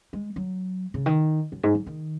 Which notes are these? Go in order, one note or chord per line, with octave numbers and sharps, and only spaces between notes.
G#3
F#3
C#3
D#3
F#2
G#2
F#3
D#3